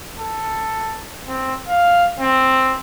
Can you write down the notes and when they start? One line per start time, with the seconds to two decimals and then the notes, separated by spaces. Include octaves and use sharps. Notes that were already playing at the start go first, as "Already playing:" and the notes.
0.20 A4
1.28 C4
1.68 F5
2.20 C4